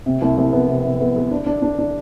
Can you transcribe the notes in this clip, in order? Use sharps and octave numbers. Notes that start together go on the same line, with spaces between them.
C3
C2
C2
B3
C3
C3
B3
B3
D4
D4
D4
D4